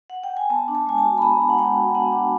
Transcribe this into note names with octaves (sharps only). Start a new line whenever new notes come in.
F#5
G5
G#5
B3 A5
D4
A5
G#3 G#5
A5
F#4
B5
B3 A#5
D4
F#5
G#3 G5
F#4
B3 F#5
D4